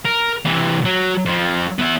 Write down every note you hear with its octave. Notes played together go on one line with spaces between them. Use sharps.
A#4
C3 E3
F#3
F2 F3
B3 E4